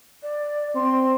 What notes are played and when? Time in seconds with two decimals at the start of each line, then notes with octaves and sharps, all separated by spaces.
0.23 D5
0.75 C4 C6